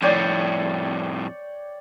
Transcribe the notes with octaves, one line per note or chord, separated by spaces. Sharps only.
F2 A2 C#5 D5 G5